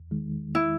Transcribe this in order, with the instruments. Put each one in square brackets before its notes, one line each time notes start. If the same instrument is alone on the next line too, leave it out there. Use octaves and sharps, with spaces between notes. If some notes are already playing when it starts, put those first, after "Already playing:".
Already playing: [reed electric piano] E2
D#3 G#3
[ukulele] E4